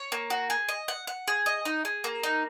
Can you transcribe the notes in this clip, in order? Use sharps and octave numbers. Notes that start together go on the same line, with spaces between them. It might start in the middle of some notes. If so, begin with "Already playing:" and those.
Already playing: C#5
A#3
F#4
G#4
D#5
F#5
F#5
G#4
D#5
D#4
G#4
A#3
D#4